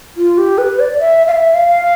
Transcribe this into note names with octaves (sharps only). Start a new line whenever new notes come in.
F4
G4
B4
D5
E5
F5
E5
F5